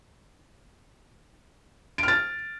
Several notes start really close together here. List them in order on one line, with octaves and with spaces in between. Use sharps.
D7 F6 A6